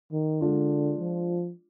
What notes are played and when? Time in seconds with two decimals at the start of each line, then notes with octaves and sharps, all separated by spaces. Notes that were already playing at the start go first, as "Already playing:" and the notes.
0.12 D#3
0.41 D3 G#3 D4 F4
0.99 F3